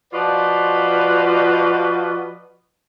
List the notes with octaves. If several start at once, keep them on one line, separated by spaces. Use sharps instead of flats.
F3 F4 F#4 B4 D5 D#5